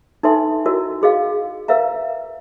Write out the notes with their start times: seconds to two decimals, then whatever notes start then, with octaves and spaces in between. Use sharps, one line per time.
0.23 D#4 A4 B4 E5 G#5 C6
0.66 E4 F#4 A#4 D#5
1.02 F#4 G#4 D#5 F5
1.68 A#4 B4 E5 F5 A#5